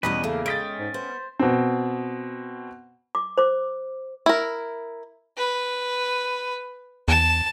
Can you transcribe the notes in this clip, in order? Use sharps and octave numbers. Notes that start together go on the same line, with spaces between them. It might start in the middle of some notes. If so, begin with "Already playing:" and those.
E2 B2 G3 C#4 B4 D#5
C#3 A3 A#3
G#3 C#4 D#5 G5 A6 B6 D7
G#2
B3 C5
B2 C4
D6
C5 D6
E4 A#4
B4
E2 A5